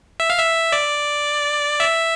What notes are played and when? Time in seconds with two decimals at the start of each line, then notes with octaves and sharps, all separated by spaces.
0.20 E5
0.30 F5
0.39 E5
0.72 D5
1.80 E5